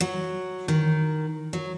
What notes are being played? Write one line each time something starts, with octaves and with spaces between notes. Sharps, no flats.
F#3
D#3
F#3